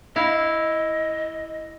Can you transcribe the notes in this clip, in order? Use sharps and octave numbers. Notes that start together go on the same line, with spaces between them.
E4 D#5 F5